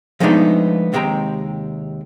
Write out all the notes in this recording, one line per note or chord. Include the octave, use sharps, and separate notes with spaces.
F3 G#3 A3 B3 D4 D#4
D#2 C3 G#3 G5 A#5